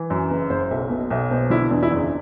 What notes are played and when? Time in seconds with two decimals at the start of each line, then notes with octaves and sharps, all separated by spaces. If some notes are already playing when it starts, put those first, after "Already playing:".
Already playing: E3
0.10 F#2
0.30 F#1 B4
0.50 F#1 C5
0.71 B1 E5
0.90 B2
1.11 B1 E5
1.31 B2 C5
1.50 D3 E4
1.70 E2 D4
1.83 E4
1.90 F#1 D4